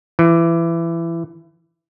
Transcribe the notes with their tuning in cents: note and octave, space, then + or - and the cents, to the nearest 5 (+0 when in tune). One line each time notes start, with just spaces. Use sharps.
E3 +20